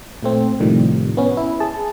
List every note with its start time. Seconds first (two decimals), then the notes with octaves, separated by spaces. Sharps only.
0.23 A#2 A3 C4
0.60 A2 C3 D#3 F3 G3
1.17 B3 C#4
1.37 E4
1.60 G#4 A5